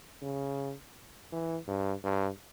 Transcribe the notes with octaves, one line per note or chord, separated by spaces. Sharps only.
C#3
E3
G2
G2